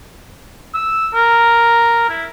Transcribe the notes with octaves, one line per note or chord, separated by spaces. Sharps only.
E6
A#4
E4